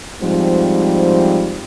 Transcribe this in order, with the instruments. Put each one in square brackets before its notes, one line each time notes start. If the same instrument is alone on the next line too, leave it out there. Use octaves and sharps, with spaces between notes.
[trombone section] G#2 F3 G3 C4